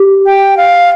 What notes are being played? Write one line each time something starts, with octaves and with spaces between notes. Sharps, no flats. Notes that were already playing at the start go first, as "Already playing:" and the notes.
Already playing: G4
G5
F5